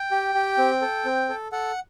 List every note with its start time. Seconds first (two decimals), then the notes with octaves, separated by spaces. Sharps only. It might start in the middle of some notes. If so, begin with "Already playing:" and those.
Already playing: G5
0.11 G4
0.35 G4
0.58 C4
0.82 A4
1.05 C4
1.29 A4
1.52 A4 F#5